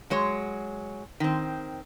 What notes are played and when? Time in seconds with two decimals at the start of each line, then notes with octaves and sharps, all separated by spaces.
0.10 F#3 G#3 C#5
1.20 D#3 C4